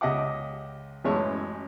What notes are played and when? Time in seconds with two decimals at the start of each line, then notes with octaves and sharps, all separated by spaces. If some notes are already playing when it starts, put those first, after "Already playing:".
0.01 C#2 G4 D#5 E5 F#5 D6
1.04 A1 F#2 E3 G#3 A3 C#5